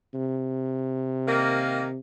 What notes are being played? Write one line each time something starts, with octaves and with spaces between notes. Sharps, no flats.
C3
D#3 A#3